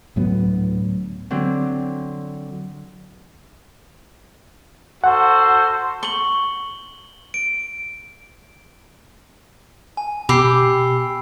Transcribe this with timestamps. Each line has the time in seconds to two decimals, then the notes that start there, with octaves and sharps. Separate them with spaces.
0.16 D2 A2 F#3 B3
1.30 D3 F#3 C4
5.04 F#4 A4 C5 F#5
6.03 C#6 F#7 G7
7.34 D7
9.97 G#5
10.29 B2 G4 B5 E6 C7